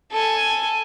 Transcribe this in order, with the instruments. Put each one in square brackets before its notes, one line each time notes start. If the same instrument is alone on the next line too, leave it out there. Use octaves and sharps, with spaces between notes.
[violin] A4 G#5